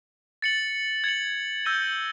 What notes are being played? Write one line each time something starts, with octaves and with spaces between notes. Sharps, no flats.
A6 C#7 F#7
G#6 C#7 F#7
E6 G6 A#6 D#7 G7